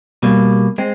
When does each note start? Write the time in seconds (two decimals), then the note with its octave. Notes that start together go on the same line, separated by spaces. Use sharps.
0.23 B2 G3 A#3
0.78 G#3 C4